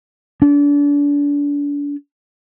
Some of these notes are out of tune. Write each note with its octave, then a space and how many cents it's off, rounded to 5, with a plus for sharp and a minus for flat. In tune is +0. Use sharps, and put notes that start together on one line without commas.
D4 -35